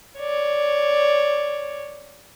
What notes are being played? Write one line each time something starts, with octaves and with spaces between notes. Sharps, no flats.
C#5 D5